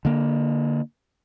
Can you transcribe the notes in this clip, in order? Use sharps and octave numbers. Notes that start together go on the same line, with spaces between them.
D3 A#3